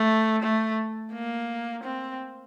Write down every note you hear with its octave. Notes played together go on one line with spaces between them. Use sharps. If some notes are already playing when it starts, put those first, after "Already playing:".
Already playing: A3
A3
A#3
C4